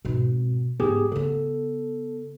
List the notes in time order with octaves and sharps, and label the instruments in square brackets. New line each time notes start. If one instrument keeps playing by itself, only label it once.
[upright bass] G#2 C4 [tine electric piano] B2
[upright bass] G#2 [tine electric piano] B3 G4 G#4
[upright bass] C#3 B3 [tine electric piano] A4